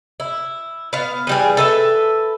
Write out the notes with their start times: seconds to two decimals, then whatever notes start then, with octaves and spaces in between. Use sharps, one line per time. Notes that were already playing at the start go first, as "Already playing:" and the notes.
0.20 E4
0.93 B3 F5
1.27 E3 G3 G#4
1.57 A4 B4 E5